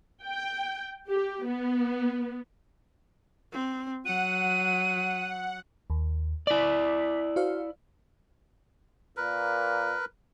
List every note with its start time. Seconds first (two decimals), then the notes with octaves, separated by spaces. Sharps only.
0.24 G5
1.09 G4
1.45 B3
3.52 C4
4.05 F#3 F#5 D#7
5.90 D#2
6.47 E4 D5 D6 B6
7.36 F#4 C5 F5
9.17 A#2 A#4 B4